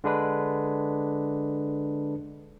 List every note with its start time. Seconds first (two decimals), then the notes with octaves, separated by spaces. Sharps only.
0.04 D3 G#3 D4 B4